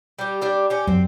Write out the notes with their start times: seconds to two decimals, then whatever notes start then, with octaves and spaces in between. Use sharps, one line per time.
0.19 G3 G4
0.41 G3 D4
0.70 C#4 G4
0.87 F#2 C4